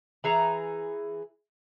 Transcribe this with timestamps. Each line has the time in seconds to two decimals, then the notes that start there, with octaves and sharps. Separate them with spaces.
0.24 E3 G#4 A#5